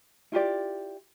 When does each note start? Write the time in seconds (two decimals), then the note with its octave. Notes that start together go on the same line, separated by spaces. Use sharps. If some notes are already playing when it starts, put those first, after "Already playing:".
0.32 E4 F4 G4 D5